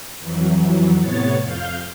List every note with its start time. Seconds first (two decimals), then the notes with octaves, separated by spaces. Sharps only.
0.19 F2 E3 F#3
0.98 A2 C3 B3 C#5 A6
1.42 F2 F5 G6